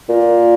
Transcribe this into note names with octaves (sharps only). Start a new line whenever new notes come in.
A#2